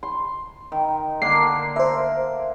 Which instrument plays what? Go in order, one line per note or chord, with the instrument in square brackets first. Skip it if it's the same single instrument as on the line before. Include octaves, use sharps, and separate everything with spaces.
[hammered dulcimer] C6
D#3
[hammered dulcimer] D3 A#3 A#4 [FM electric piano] C7
[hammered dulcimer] A#4 [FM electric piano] C5 E5